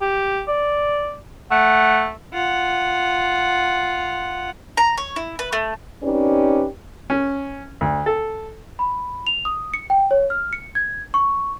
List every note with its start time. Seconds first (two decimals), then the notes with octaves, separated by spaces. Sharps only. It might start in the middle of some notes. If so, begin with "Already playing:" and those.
0.02 G4
0.48 D5
1.51 A3 F#5
2.33 F4 F#5
4.77 A#5
4.97 C#5
5.16 E4
5.39 B4
5.52 A3
6.03 C4 C#4 D#4 G4 B4 D5
7.10 C#4
7.81 D2
8.06 A4
8.79 B5
9.27 F7
9.45 D#6
9.74 C#7
9.90 G5
10.11 C#5
10.30 F6
10.53 C#7
10.75 G#6
11.14 C#6